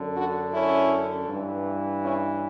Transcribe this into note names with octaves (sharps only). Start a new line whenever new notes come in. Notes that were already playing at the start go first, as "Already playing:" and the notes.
Already playing: F#2 D3
D4 F#4
C#4 E4
G2 E3
C#4 E4